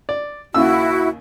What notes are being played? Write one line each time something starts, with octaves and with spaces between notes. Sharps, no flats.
D5
D#2 C#3 E4 F#4 E6